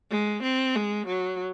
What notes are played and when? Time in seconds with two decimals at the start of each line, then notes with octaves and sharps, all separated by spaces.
0.11 G#3
0.43 C4
0.75 G#3
1.07 F#3